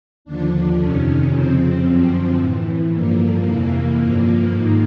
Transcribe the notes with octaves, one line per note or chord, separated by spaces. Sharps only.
D#2 D3 F3 D4
F2 C3 D#3 C#4
F2 C#3 F3 C4
F#2 D3 F3
A2 E3
G2 D3 F3 A#3
F2 C3 E3 A#3
G2 D3 F3
G#2 D#3 A#3